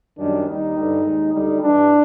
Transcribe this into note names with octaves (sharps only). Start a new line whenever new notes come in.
F#2 D#3 G3 D4
D#2 D#3 G3 D#4
G2 D3 G3
D#2 D#3 G#3
D2 D3 G3 D#4
G2 E3 G3 D4